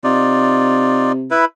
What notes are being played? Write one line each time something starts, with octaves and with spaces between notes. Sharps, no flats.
C3 D#4 F4 D5
E4 B4